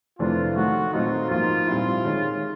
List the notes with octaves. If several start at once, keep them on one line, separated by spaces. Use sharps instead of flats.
F2 C3 E3 A3 D4 F4
D#3 F#3 A3 F#4
A#2 F#3 A3 C4 D#4 F4
G#2 F3 A#3 F4
A#2 G3 C4 E4
D#3 G#3 C#4